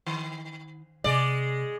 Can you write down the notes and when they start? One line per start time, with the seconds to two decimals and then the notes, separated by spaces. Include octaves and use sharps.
0.06 D#3
1.04 C3 G#3 D5